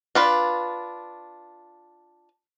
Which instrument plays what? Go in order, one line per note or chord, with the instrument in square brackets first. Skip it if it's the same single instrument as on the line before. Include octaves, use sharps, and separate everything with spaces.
[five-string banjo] D4 F4 B4